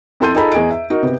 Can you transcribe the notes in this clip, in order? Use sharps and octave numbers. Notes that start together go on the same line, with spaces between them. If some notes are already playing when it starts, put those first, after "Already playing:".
F2 E4 A4 C6 G6 D#7
D#4 F4 G#4 A4 A#5 B5
E2 G#4 D#5 D7
E5
D#4 F#4 A#4
C3 B3